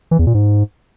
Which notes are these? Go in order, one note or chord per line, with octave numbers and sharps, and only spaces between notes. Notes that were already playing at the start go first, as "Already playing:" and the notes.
E3
E2
A#2
G#2